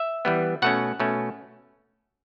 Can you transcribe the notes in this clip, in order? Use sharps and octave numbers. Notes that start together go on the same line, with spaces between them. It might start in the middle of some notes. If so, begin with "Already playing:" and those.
Already playing: E5
E3 G3 B3
B2 A3 C#4 F#5
B2 A3 C#4